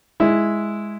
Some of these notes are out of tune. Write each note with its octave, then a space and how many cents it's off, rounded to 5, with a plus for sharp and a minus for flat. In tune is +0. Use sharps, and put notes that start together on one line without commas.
G#3 +0 E4 +0